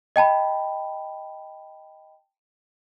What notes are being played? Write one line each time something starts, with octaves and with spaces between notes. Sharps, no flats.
D#5 G5 A5 B5